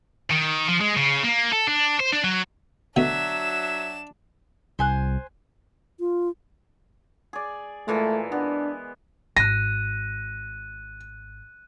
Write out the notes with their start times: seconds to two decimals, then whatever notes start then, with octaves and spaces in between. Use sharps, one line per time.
0.31 D#3
0.68 F3
0.81 G#3
0.97 C#3
1.23 A#3
1.52 A4
1.67 D4
2.00 C5
2.13 D4
2.24 F#3
2.96 B2 D3 F#3 A3 D4 E5 E7
4.79 C2 C5 G#5 F#6
6.00 F4
7.33 G#4 D5
7.88 A#2 E3 G#3 A3
8.32 B3 D4
9.37 G#1 F#6 A#6 D#7